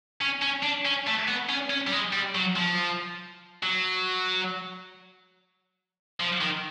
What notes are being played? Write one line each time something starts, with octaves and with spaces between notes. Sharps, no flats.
C#4
C#4
D4
C#4
A3
B3
C#4
C#4
G3
G#3
G3
F#3
F3
F#3
F3
D#3